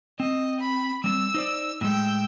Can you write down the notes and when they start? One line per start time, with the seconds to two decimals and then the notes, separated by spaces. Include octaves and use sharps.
0.20 C4 D#5
0.60 B5
1.04 G3 A#3 C4 E6
1.34 D#4 C5 D5
1.81 A2 G3 G#3 G5 E6